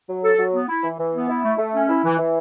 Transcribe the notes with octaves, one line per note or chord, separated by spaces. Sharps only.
F#3
A4
F#3
B3
E4
E3
E3
B3
E4
A3
A3
C#4
E4
E3
E3